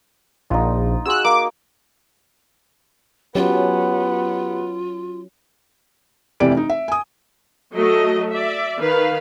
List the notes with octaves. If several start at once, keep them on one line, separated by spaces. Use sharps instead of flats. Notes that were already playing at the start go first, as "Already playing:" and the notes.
A#1 D#4 F4
F#4 G#4 C6 E6 F#6
A#3 D6
F#3 B3 C#4 F4 G4
F1 C3 E3 G4 D5 D7
D#4
E5
G#5 D#6
F#3 A3 D#5
D5 E5
D#3 B4 F5